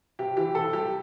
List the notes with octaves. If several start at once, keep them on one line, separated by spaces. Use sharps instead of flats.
C3 G4
E3 G4
C3 A4
G3 G4